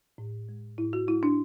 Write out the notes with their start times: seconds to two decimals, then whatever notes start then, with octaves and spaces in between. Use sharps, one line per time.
0.18 A2
0.49 G#3
0.78 A2 E4
0.93 F#4
1.08 G#3 E4
1.23 D4